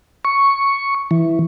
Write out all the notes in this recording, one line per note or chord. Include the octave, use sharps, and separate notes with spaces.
C#6
E3